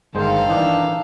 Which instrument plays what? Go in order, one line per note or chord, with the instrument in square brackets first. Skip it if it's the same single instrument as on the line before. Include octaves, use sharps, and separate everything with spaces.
[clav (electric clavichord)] G1 G#3 C5 [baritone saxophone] D#3 [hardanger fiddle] A4 F5
[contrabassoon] E3 [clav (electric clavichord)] D4 D#4